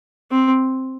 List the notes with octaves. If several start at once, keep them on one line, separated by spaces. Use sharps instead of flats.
C4